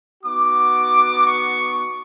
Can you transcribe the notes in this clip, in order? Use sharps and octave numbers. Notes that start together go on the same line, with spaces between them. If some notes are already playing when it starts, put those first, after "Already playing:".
B3 D#4 F#4 D6
C#6